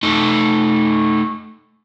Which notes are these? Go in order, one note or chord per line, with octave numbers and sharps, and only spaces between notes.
A3 D#4